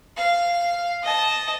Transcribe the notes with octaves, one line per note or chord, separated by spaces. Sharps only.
F5
D#5 A5